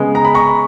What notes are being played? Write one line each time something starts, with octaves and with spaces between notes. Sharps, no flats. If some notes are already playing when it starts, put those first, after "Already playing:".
Already playing: C#3 G#3 B3
A#5
B5
A#5 C#6